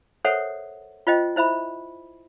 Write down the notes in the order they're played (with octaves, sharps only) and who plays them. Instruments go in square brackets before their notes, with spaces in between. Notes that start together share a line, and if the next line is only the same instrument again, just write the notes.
[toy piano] A4 A#4 C5 C#5 E5 F#5
F4 C5 D#5 G5
E4 C5 E5 B5